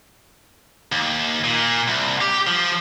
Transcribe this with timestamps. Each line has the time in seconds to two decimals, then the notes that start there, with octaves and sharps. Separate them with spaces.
0.92 D#2
1.44 A#2
1.88 C2
2.21 G4
2.47 F3